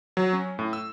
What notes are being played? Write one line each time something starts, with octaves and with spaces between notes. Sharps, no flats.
F#3
C#4
A2
E6